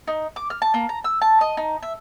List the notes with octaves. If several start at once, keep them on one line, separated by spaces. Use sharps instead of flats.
D#4
D6
F6
A5
A#3
A#5
E6
A5
D#5
D#4
E5